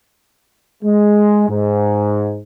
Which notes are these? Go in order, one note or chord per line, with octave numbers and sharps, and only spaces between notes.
G#3
G#2